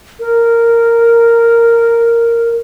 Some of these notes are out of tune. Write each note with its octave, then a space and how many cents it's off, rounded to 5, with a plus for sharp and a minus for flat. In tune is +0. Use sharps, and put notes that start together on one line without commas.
A#4 -10